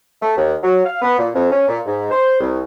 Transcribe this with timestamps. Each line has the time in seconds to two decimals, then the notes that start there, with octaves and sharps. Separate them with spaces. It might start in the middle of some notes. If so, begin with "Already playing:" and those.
0.21 A3
0.36 D#2
0.62 F#3
0.84 F5
1.01 B3
1.18 A#2
1.34 F2
1.50 C#4
1.68 A#2
1.85 G#2
2.11 C5
2.40 C2